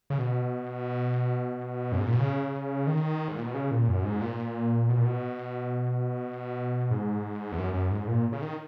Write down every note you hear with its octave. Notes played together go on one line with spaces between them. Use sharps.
C#3
B2
F#2
G#2
A#2
B2
C#3
D#3
G#2
A#2
B2
C#3
A#2
F#2
G#2
A#2
B2
A#2
B2
G#2
E2
F#2
F#2
G#2
A#2
C#3
D#3